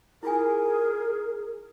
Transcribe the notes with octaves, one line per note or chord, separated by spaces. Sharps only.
E4 F4 G#4 A#4 G#5